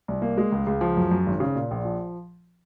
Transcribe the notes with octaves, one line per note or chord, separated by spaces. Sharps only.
C2
A#3
G#3
C#2
C#2
F3
F#2
F#2
G#1
C#3
A#2
A#1
F3